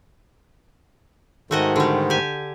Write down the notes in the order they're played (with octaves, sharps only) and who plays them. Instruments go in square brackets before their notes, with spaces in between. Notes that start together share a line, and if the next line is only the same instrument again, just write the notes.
[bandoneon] G#2 D#3 [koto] A3 F#4 D#5
[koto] D3 G3
G4 G#5